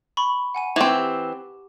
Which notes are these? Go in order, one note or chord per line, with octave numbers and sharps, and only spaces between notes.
B5 C#6 G7
F#5 G#5 D#7
E3 C4 C#6 D6
G4